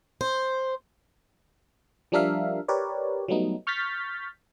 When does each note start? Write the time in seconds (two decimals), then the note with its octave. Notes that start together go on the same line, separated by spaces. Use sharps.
0.21 C5
2.12 F3 G3 D4 A#4 E5 F5
2.68 G4 A#4 B4 C#5 D5
3.28 F#3 G3 A3 B3 D#4
3.67 C#6 F6 G6 A6 B6